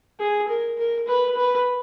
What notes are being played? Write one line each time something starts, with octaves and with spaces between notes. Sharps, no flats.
G#4
A#4
A#4
B4
B4